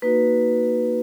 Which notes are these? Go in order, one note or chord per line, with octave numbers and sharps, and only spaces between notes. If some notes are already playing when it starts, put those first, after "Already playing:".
A#3 D#4 F#4 B4